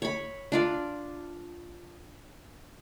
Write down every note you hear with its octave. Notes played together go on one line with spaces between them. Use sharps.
C#5 B5
D4 F4 D5